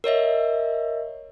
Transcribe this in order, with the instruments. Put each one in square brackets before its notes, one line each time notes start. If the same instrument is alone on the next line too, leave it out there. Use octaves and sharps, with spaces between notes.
[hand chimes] A#4 C#5 D#5 E5